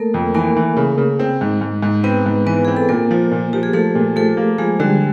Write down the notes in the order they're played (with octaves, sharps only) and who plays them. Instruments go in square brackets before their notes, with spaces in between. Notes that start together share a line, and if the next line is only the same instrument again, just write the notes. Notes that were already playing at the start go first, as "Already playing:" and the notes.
Already playing: [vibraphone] A3 A#3 A4 A#4
[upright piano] F2
[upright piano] E3 [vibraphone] A#3 A#4
[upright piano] E3
C#3
C#3
C4
G#2
G#2
G#2
[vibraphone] B3 B4 [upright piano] C4
[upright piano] G#2
[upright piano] E3 [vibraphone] B3 B4
[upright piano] C4 [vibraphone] G#4
[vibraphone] A4
[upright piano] A#2 [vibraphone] A#3 A#4
[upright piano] F3
A#2
[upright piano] F3 [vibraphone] G4
[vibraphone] G#4
[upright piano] F3 [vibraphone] A3 A4
[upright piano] A#2
[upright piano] F3 [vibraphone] A3 A4
[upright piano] A#3
[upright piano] F3 [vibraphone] G#3 G#4
[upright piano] D3 [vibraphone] G3 G4